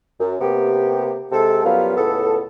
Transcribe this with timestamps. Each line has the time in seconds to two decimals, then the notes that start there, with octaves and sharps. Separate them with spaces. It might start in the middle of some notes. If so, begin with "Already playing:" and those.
0.20 F#2
0.41 C3 A#3 B3 G4
1.32 C3 G#3 G4 A4
1.64 F#2 F#3 G3 B3 F4 F5
1.97 C#2 A2 B3 A4